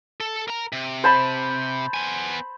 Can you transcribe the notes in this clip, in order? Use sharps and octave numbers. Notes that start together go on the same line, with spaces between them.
A4
A#4 A#5
C3
C5 A5 B5
B3 G#5